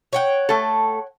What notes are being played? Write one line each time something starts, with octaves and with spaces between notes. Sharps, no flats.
C#5 F#5 G5
A3 A4